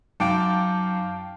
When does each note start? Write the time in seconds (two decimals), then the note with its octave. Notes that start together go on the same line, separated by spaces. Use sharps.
0.20 F#2 D#4 F5 G5 A5 D6 D7